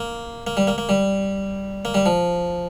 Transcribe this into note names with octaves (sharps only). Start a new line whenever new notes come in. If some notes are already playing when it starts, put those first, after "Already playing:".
Already playing: A#3
A#3
G3
A#3
A#3
G3
A#3
G3
F3